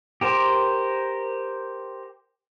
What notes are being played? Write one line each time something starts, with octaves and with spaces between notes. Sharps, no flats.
G4 A#4 C5